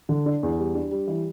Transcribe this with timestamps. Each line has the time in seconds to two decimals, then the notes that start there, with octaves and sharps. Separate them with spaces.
0.09 D3
0.26 D4
0.43 E2
0.59 G3
0.75 D4
0.91 G3
1.07 E3